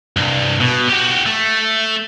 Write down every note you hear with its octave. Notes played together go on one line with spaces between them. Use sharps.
C2 G2
B2
F#4 G4
A3